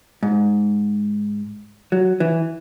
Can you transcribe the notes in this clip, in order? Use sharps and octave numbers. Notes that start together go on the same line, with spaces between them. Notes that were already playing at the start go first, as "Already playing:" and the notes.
G#2
F#3
E3